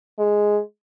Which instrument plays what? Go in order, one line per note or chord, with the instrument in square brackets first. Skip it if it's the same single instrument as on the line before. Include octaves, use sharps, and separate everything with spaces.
[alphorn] G#3